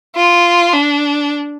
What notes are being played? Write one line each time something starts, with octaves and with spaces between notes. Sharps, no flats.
F4
D4